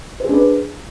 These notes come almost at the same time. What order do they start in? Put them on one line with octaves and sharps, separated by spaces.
C5 G#4 D4 B4